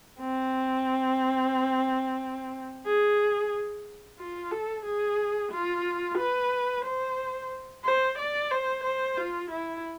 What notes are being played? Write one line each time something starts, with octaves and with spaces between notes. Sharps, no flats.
C4
G#4
F4
A4
G#4
F4
B4
C5
C5
D5
C5
C5
F4
E4